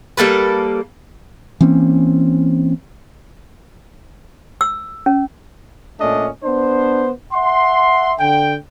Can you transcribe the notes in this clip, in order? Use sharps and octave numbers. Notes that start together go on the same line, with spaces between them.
G3 A#3 A4 B4
E3 A#3 C4 C#4
E6
C#4
A#2 A3 C#4 D4 D#5
B3 D4 C5
E5 F#5 C6
D3 G5